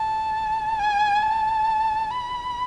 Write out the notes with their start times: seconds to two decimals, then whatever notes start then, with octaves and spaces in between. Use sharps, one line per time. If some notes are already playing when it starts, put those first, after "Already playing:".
Already playing: A5
0.79 G#5
1.23 A5
2.10 B5